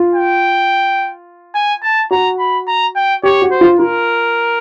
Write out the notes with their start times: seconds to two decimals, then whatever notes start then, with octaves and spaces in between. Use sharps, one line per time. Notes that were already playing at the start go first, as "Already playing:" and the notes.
Already playing: F4
0.14 G5
1.55 G#5
1.83 A5
2.11 F#4 A#5
2.39 B5
2.67 A#5
2.95 G5
3.23 G4 C#5
3.42 F#4
3.51 C5
3.61 F4
3.79 F4 A#4